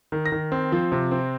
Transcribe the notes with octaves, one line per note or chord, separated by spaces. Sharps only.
D#3
A#6
D#3
C4
F3
C3
C4